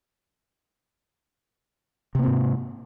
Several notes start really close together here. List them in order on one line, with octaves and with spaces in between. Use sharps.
C3 A#3 C4 G#2